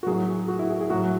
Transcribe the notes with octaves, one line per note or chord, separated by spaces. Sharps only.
F#4
A2 F#3 G#4
F#4
E4
G#4
G#4
A2 F#3 F#4